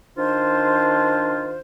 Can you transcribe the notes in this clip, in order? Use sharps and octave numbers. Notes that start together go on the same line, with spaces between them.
D#3 D4 F4 C5